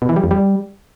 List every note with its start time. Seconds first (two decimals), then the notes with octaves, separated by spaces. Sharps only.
0.02 B2
0.09 E3
0.16 G3
0.24 F2
0.31 G3